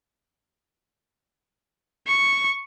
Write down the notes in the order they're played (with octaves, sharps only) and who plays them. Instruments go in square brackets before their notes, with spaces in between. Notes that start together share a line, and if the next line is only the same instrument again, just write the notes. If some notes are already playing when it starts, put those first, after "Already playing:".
[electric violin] C#6